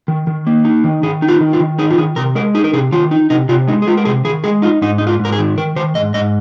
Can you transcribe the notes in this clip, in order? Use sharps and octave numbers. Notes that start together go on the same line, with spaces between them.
D#3
D#3
A#3
D#4
D#3
D#3 G#4
D#4
F4
D#3
F4
D#3
D#4 G#4
F4
D#3 G#4
C3 A#4
G#3 A#4
D#4 G#4
A#4
C3 G#4
D#3 F4
D#4
C3 D#4
C3 F4
G#3 D#4
G#4
G#3 F4
A#4
C3 G#4
D#3 G#4
G#3 G#4
D#4 F4
G#2 D#4
G#2 D#4
F4
G#2
A#4
G#4
D#3
D#3 A#4
D#3 C5
G#2 D#5
G#2 D#5